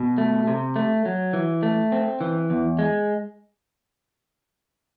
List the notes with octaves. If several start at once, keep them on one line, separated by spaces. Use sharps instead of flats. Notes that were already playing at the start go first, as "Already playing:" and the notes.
Already playing: B2
A3
C3
A3
F#3
E3
A3
C4
E3
E2
G#3